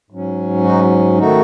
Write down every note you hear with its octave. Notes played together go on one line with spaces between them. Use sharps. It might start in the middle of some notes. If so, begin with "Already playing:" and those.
G#2 F#3 C#4
D#4 F#4
D#3 A3 D#4 F#4